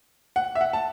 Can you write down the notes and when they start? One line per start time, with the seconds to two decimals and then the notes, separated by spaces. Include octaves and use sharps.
0.36 F#5
0.55 E5
0.61 F#5
0.73 A5